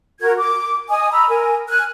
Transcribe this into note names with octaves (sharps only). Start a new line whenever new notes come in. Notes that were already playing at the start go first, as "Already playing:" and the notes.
F#4 A#4 G#6
D6
D#5 G#5 D#6
A#5 B5 E6
A#4 G#5
G#5 F6 F#6